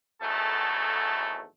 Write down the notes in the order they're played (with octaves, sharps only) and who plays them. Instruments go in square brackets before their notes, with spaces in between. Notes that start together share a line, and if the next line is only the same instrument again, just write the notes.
[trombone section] G#1 E2 F#3 A3 A4